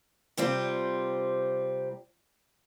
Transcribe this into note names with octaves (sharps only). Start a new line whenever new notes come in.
C3 G3 C4 F4